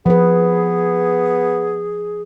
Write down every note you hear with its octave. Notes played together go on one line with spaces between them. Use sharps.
F3 B3 G#4 B4